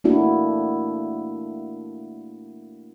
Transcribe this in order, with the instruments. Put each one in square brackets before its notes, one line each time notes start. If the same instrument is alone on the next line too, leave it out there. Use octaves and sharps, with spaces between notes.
[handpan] A3 A#3 D4 E4 F#4